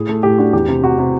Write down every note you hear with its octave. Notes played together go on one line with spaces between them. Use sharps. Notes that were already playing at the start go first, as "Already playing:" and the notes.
Already playing: A2 G#4
A3
A2 G4
D4 F#4
E2 G4
C3
C3 F#4
C3